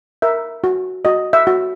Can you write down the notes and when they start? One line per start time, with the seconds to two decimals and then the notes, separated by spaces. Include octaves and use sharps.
0.22 A#4 E5
0.64 F#4
1.05 F#4 D#5
1.33 E5
1.47 F#4